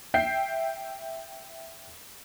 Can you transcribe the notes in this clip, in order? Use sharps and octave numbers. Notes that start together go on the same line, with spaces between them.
E5 G5 G6 C7